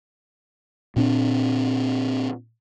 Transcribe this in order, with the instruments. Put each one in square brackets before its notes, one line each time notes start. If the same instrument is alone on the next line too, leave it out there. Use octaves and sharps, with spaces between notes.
[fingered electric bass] A#2 C4 D4